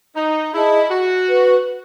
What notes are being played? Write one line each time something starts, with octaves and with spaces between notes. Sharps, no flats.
D#4
E4 G#4 D#5 A5
F#4
B4